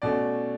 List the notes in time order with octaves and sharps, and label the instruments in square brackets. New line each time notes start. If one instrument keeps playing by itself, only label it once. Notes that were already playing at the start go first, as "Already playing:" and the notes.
[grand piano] B2 A3 C#4 D5